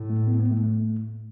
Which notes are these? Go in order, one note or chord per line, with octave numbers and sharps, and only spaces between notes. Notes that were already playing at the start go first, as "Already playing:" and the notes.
Already playing: A2
A3
B3
B3
A3
A3